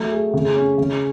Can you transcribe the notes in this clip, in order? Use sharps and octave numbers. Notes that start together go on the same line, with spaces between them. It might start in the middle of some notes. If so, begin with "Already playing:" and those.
Already playing: F#3 A3
G#4
C#3
C#4
C#3